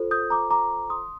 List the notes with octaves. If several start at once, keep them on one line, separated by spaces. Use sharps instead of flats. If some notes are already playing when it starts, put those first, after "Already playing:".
Already playing: F4 A4 C5
D#6 G6
A#5 D6
A#5 D6
C6 D#6